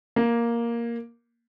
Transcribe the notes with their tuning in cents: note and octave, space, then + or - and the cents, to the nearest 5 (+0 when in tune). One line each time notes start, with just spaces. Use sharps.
A#3 +5